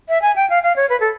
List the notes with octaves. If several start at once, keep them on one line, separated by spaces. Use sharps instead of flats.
E5
G#5
G5
F5
F5
C#5
B4
A4